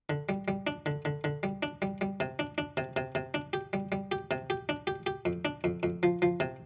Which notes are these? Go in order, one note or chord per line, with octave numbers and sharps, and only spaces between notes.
D3
G3
G3
D4
D3
D3
D3
G3
D4
G3
G3
C3
D4
D4
C3
C3
C3
D4
G4
G3
G3
G4
C3
G4
D4
G4
G4
F2
D4
F2
F2
F3
F3
C3